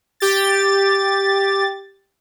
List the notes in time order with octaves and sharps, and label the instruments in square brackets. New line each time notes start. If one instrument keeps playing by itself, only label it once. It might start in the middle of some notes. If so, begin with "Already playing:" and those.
[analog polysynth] G4 A6